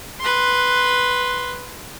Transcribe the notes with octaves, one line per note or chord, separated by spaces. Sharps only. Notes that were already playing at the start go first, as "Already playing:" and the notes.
B4 C6